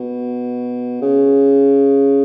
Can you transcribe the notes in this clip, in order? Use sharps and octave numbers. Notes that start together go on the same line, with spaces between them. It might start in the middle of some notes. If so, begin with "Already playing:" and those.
Already playing: B2
C#3